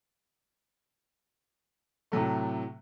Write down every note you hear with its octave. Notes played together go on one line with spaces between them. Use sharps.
A2 C3 F#3 A3